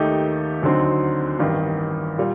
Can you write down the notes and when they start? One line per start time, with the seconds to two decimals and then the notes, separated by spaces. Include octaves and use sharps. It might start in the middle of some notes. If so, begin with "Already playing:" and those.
Already playing: D#2 D#3 A3 D#4 G4
0.63 D2 D3 F#3 C4 D#4
1.39 A1 G2 D#3
2.18 A#2 G3